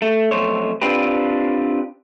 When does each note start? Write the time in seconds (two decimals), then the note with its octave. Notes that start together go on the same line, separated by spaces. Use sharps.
0.02 A3
0.31 B1 F2 A3 C5 C#5
0.81 C4 D4 F4 G4 B4